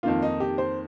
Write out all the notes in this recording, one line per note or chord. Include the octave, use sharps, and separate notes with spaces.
F2 D#3 A#3 F4
D#4
G4
C5